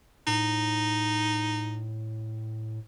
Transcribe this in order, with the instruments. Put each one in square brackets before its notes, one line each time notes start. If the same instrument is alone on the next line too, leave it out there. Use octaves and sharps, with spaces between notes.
[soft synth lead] A2 [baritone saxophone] D#4